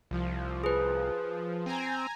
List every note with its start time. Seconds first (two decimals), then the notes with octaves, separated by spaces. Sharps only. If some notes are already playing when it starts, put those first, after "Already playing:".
0.11 C2 F3
0.64 G#4 B4
1.66 C4 G#5 A#5